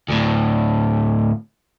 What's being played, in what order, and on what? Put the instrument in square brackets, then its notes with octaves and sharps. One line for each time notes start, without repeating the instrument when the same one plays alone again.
[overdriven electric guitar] D2 A2